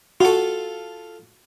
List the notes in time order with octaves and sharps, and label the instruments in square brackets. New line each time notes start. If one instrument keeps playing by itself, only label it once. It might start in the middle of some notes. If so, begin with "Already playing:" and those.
[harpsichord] F4 A4 [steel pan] F#4